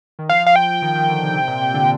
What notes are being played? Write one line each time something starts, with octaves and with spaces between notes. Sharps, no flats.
D#3
F3 F5
F5
G5
D#3
D#3
D3
C3
C3
A#2
C3
D3